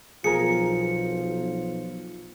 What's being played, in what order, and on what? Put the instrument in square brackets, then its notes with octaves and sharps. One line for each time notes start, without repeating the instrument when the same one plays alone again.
[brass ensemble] B1 [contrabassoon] F3 [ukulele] G#4 A#4 [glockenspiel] C#7